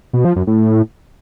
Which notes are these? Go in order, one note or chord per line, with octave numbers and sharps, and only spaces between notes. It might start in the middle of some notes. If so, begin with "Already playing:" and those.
B2
F3
F#2
A2